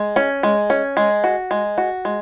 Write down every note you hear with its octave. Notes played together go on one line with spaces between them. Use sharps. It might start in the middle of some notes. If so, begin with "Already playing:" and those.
Already playing: G#3
C#4
G#3
C#4
G#3
F#4
G#3
F#4
G#3